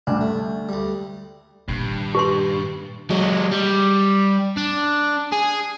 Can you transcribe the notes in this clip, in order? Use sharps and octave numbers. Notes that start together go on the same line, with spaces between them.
D2 G2 D4
A3
D2 G3
G2 A#2 D#3
G4 B4 C6
F#3 G#3
G3
D4
G#4